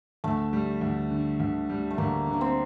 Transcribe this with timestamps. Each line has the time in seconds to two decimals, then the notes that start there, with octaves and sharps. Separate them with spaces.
0.24 D2 A3
0.53 G3
0.81 D2
1.10 D3
1.40 D2
1.70 G3
1.90 A3
1.98 D2 A#3
2.27 D3
2.33 A#3
2.41 C4